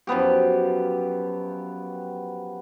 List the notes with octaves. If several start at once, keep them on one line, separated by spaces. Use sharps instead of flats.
F#2 F3 B3 G4